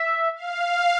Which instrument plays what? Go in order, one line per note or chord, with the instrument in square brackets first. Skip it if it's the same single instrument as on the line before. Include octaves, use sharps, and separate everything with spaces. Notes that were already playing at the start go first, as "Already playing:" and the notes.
Already playing: [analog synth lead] E5
[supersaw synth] F5